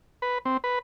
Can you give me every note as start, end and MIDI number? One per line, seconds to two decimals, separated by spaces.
0.22 0.38 71
0.45 0.57 60
0.64 0.79 71